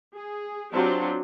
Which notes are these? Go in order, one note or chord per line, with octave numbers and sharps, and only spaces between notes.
G#4
F#3 C4 D4 F4 G4